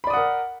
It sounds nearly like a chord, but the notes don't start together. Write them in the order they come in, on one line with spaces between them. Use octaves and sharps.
B5 D5 D#6 F#5 A#4